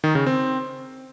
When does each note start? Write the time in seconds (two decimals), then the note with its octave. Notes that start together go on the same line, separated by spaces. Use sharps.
0.04 D#3
0.15 C#3
0.26 C4